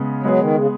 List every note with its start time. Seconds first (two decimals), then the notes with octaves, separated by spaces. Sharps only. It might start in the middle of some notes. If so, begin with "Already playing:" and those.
Already playing: C#3 G#3 B3
0.23 F#3 G#3 B3 G#4
0.39 D#3
0.55 C#3